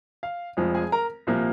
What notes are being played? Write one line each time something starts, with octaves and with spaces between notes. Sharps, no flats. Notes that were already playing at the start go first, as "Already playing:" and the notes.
F5
F1 F2 F3 G#3
G#4 G#5
A#4 A#5
C2 A#2 F3 A#3